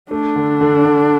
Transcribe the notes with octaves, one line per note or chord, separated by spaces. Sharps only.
A3 D4
D3
D3
D3